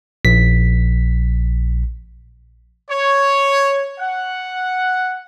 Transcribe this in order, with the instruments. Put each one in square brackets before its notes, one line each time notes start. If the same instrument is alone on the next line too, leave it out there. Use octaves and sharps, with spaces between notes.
[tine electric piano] A#1 B6
[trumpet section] C#5
F#5